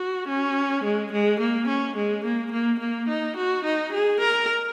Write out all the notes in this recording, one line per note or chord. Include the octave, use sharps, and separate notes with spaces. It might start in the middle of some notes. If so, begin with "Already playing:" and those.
Already playing: F#4
C#4
G#3
G#3
A#3
C#4
G#3
A#3
A#3
A#3
D#4
F#4
D#4
G#4
A#4